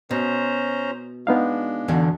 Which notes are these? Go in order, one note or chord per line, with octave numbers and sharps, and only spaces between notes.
B2 C#4 C5 A#5
G#3 B3 D4 D#4 F5
E2 B2 D3